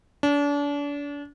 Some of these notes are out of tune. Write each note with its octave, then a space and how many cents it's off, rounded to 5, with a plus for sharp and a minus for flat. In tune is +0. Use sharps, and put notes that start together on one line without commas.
D4 -35